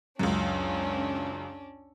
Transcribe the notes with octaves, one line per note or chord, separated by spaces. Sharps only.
C#2 F#2 C#4 D4